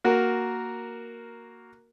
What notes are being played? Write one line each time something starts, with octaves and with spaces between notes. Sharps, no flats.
A#3 F#4 A#4